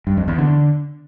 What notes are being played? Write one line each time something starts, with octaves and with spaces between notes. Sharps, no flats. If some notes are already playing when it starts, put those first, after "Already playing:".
G2
F2
E2
D3